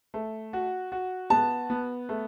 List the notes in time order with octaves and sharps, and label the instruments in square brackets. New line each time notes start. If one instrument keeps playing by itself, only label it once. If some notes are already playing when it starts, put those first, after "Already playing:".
[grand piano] A3
F#4
F#4
[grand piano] B3 [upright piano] A5
[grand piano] B3
A3